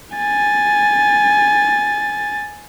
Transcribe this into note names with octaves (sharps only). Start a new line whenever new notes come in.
G#5 A6